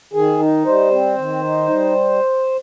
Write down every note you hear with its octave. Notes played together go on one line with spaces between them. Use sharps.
D#3 G#4
D#4
G3 C5
C4
D#3
D#4
G3